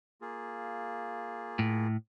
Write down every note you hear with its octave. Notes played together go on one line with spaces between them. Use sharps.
A#3 F4 G#4
A2